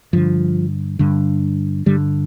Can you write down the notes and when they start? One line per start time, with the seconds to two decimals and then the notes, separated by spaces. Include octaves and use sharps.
0.13 G2 D3 F3
0.99 G2 D3
1.86 G2 D3 G3